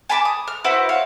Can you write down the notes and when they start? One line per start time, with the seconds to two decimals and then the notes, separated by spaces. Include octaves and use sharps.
0.09 G#5 A5 B5 D6
0.25 D#6
0.48 F6
0.64 E4 F#4 B4 C5
0.89 C#5 F5